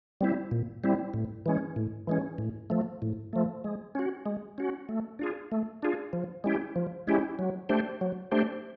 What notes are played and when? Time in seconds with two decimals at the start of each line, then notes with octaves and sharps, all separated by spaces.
0.21 G3 C4 E4
0.51 A#2
0.84 G3 C4 E4
1.14 A2
1.46 E3 G#3 C#4
1.76 A2
2.07 E3 G#3 C#4
2.38 A2
2.70 F3 A3
3.02 A2
3.33 F3 A3
3.64 G#3
3.95 C#4 F#4
4.26 G#3
4.58 C#4 F#4
4.89 A3
5.19 D4 F4 G#4
5.52 A3
5.83 D4 F4 G#4
6.13 F3
6.44 G#3 C#4 E4 G4
6.76 F3
7.07 G#3 C#4 E4 G4
7.39 F#3
7.69 A3 D4 G4 C5
8.01 F#3
8.31 A3 D4 G4 C5